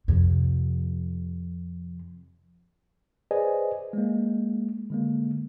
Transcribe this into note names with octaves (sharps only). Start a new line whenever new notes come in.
F2 C3
G#4 B4 C5 D5 D#5 G#5
G#3 A#3
D3 G#3 A#3